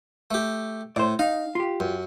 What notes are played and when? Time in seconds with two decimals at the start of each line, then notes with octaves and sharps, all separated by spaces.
0.31 A3 G4
0.96 A2 C5 D5
1.19 D#4 F5
1.55 F4 G4
1.80 F#2